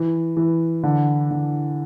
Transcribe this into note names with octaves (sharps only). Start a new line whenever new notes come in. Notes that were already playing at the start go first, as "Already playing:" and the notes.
Already playing: E3
E3
D3
D3